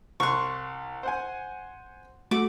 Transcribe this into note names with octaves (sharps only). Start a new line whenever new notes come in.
C2 C6 C#6 F#6
C5 F#5 G#5
A3 F#4 D6